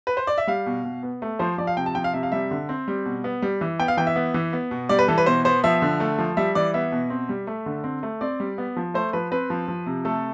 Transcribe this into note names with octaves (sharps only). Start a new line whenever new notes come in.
B4
C5
D5
E5
G3 F5
B2
B2
B3
A3
F3 C5
F3 D5
F5
C3 G5
A5
F3 G5
F5
C3 E5
F5
G3 E5
D3
C4
G3
B2
B3
G3
E3
B3 G5
F5
E3 G5
E5
B3
E3
B3
B2
G3 D5
B4
E3 A4
B4
B2 C5
B3 C5
F3 E5
D3
A3
F3
G3 E5
E3 D5
B3 E5
B2
C4
G3
A3
D3
C4
A3
C4 D5
G3
B3
F3
A3 C5
F3 B4
C4 B4
F3
F3
C3
A3 A4